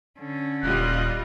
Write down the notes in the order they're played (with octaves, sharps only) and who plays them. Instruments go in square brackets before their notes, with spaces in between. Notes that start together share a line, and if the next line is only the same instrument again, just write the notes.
[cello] D3 C#4
[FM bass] D#1 [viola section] G3 F4 D#5 [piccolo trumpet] F#6